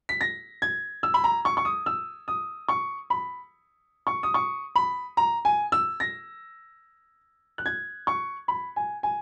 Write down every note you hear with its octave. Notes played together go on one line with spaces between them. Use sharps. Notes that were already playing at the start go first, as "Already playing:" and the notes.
B6
A#6
G#6
E6
B5
A#5
C#6
C#6
D#6
E6
D#6
C#6
B5
C#6
D#6
C#6
B5
A#5
G#5
E6
A#6
F#6
G#6
C#6
B5
G#5
G#5